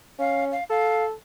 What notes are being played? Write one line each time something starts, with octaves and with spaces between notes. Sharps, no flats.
C#4 F5
F5
A4 F5